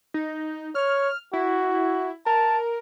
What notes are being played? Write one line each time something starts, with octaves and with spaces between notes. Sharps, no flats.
D#4
C#5 F6
E4 F#4
A#4 A5